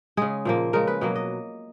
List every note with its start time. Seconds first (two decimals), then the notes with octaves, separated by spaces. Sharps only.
0.17 C#3 G#3 G#4
0.45 A#2 F3 A#3
0.73 C#3 G#3 A#4
0.87 B4
1.01 B2 F#3 A#3
1.15 D#5